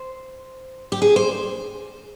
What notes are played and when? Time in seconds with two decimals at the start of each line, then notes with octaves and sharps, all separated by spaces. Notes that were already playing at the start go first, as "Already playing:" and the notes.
Already playing: C5
0.92 G4
1.02 G#4
1.16 C5